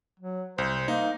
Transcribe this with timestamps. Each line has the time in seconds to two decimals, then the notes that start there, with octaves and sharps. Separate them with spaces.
0.20 F#3
0.58 C2 C5
0.88 A#3 D#4